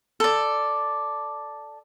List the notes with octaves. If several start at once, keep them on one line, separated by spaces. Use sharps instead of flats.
A4 D5